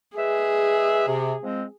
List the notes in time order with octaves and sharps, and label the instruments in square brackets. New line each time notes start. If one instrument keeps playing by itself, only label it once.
[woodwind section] G#3 B4 E5 [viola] G#4
[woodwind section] C3
F3 G#3 C4